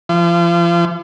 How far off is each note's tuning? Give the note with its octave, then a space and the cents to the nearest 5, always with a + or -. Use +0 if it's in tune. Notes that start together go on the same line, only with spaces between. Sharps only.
F3 -35